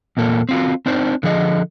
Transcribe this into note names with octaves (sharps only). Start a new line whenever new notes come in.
E2 A#2 A#3 A4
C4 F4 F#4
C4 D4 D#4 C5
D3 F3 G#4 A4 D#5